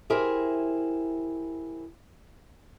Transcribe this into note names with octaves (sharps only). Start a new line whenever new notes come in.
E4 G4 G#4 A#4 C5